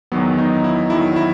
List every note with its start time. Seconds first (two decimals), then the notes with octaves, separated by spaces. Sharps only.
0.12 E2 D#3 F#3 B3
0.38 D#4
0.64 E4
0.90 E2 D#3 F#3 E4
1.16 E4